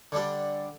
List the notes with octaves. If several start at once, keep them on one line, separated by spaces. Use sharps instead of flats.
D3 G3 D4